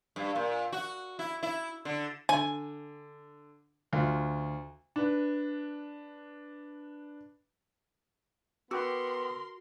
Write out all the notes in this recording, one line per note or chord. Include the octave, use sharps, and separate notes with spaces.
G2
A#2
F#4
E4
E4
D3
D3 G#5
D2 F4
D4 B4
B3 F#4 A#4 G5 C6 D6 E6